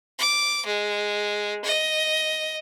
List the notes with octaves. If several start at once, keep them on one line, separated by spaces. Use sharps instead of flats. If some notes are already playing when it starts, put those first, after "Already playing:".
D6
G#3
D#5